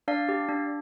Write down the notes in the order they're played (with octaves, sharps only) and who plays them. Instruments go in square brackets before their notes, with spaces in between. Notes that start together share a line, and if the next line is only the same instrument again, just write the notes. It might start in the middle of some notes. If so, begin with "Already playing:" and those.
[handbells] D4 D5 F5
G4
D4